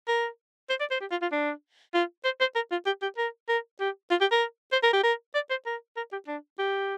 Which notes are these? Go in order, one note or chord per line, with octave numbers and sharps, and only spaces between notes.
A#4
C5
D5
C5
G4
F4
F4
D4
F4
C5
C5
A#4
F4
G4
G4
A#4
A#4
G4
F4
G4
A#4
C5
A#4
G4
A#4
D5
C5
A#4
A#4
G4
D4
G4